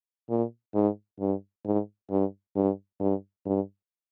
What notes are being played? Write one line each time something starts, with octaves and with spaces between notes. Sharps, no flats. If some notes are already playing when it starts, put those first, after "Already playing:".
A#2
G#2
G2
G#2
G2
G2
G2
G2